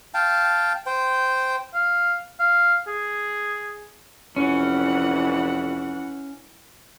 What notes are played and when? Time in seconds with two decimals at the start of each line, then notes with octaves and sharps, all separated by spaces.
0.14 F5 G5 A5
0.86 C5 G5
1.74 F5
2.40 F5
2.87 G#4
4.36 F1 E3 C#4 F#5